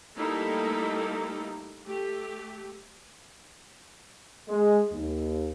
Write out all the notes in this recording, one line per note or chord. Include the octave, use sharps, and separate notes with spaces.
G3 A3 A#3 D#4 E4 A4
A3 G4
G#3
D#2